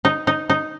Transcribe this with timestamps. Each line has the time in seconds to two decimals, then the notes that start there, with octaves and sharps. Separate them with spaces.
0.05 D#4
0.27 D#4
0.50 D#4